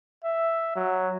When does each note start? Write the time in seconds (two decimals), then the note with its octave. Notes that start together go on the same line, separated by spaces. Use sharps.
0.24 E5
0.76 F#3